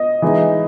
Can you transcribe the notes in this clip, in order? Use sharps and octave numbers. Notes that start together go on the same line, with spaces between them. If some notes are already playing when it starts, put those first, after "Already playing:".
Already playing: D#5
E3 G#3 D#4